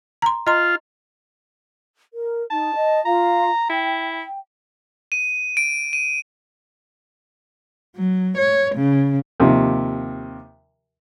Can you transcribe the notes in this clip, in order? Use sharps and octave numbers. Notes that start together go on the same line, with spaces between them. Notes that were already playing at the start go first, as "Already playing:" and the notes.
A#5 C6
F4 D#5 A#5 C6
A#4
D#4 A5
D#5
F4 F5 A#5
E4 G5
D#7
D7
D#7
F#3
C#5
C#3
D#2 C3 F3